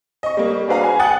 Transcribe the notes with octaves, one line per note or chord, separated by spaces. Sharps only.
D#5 C#6
G3 A#3
D4 F#4 G#4 B4 F5 A#5
G#5
F#5 G5 D#6 F#6 A6